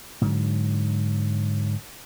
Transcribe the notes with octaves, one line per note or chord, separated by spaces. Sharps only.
G#2 D3 F#3